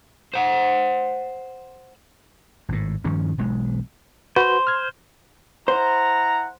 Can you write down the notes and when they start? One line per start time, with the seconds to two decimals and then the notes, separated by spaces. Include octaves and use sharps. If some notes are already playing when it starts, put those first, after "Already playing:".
0.34 C5 F#5
2.69 G#1 A2
3.04 G2 D#3 F3 C#4
3.38 E1 B1 G#3
4.36 F#4 B4 C5
4.67 F6 G#6
5.68 E4 C5 F#5 A#5